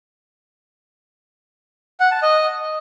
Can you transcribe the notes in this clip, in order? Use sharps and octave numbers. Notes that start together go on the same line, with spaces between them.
F#5
A5
D#5